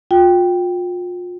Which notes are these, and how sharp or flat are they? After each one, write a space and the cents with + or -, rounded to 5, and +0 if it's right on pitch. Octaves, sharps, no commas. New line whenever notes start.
F4 +35 G5 +0